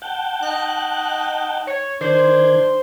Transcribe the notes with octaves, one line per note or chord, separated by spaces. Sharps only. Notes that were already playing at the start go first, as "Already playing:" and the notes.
F#5 G5 A5
D#4 F#6
C#5
D#3 D4 C5 G#6